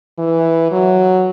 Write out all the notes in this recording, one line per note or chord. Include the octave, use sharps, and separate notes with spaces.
E3
F#3